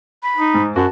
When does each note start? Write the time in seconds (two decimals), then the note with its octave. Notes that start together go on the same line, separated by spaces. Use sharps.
0.23 B5
0.37 D#4
0.54 G#2
0.76 F#2 F#4 A5